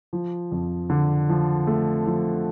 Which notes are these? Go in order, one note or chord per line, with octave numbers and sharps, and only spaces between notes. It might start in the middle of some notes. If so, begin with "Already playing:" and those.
F3
F2
D3
F3
A3
F3